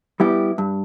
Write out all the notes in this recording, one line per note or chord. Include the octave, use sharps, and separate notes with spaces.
G3 B3 E4 G4
G2